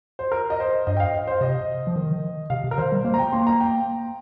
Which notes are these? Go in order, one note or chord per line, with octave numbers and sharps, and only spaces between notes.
C5
A#4
D#5
C5
G2 D#5
G5
F5
D#5
C5
C3 D#5
F3
D#3
C3 F5
C3
A#4
D#3 C5
G3
A#3 C5
A#5
G5
A#3 C6
A#5
G5